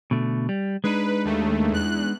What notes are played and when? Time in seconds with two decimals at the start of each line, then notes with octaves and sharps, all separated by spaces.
0.11 B2 D3 A3
0.49 G3
0.84 G#3 D4 D#4 B4
1.25 D#2 A3
1.71 E2 F#6